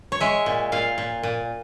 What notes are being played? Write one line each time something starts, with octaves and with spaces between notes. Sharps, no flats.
C#5
G#3 E5
A#2
A#2 F5
A#2
A#2